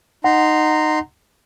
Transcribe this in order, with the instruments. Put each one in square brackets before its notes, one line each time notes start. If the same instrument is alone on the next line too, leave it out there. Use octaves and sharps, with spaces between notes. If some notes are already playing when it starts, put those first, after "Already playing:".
[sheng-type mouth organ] D#4 A#5 C6 [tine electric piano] F#5